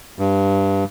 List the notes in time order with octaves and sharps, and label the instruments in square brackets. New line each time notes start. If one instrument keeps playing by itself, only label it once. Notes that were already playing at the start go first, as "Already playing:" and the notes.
[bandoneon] G2